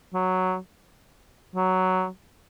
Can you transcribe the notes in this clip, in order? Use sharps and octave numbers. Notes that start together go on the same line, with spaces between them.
F#3
F#3